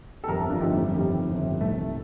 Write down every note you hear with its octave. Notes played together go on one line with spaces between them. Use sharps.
A4
G1 F2 D3 G4 A#4
D4 F4
G1 F2 D3 D#4 G4
A3
G3
G1 F2 D#3 G3
G1 F2 D#3
C2 C3 D#3 A3